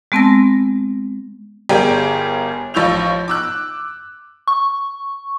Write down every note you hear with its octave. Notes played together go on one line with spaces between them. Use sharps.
G#3 B3 C4 A5 E6 A#6
G1 G3 G#4 A#4 G5 G#5
A1 F3 C#6 E6 G6 F7
D6 E6 F#6
C#6